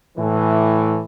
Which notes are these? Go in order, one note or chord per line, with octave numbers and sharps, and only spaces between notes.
A2 E3